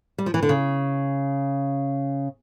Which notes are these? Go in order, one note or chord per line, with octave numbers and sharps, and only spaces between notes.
G3
F3
E3
D3
C#3